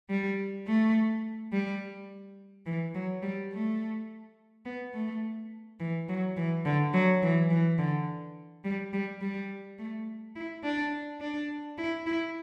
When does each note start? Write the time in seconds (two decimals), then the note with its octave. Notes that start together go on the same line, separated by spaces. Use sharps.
0.10 G3
0.67 A3
1.53 G3
2.66 E3
2.95 F#3
3.23 G3
3.52 A3
4.66 B3
4.94 A3
5.80 E3
6.09 F#3
6.37 E3
6.65 D3
6.94 F#3
7.22 E3
7.50 E3
7.79 D3
8.64 G3
8.93 G3
9.21 G3
9.79 A3
10.36 E4
10.64 D4
11.21 D4
11.78 E4
12.07 E4